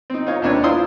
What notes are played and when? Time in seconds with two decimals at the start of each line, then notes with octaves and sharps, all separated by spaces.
0.10 C4 D#4
0.27 D#4 F4 C#5
0.41 D#2 C3 D#3 D4 B4 C#5
0.63 E4 F4 C5 C6 D#6 E6